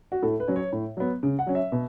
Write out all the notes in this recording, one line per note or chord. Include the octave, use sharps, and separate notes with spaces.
F#4
A2 A4
B4
F#3 C#4
C#5
A2
F#3 B3
C#3
F#5
F#3 C#4
E5
B2